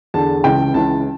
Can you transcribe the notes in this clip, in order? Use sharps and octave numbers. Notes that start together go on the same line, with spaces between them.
E2 D3 A5
C#2 C#3 E3 G5
C#2 C#3 E3 A5